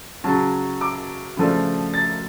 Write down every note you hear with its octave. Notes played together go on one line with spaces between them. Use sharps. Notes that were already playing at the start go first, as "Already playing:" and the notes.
C#3 F#3 C#4 A5
D6
C#3 F3 A3 D4
A6